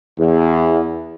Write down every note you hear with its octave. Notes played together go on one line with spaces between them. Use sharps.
E2